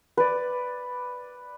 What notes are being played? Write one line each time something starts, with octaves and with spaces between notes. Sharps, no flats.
B4 D5